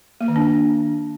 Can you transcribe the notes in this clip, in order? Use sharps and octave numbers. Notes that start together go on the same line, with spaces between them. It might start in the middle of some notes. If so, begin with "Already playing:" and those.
A#3
D#3
D4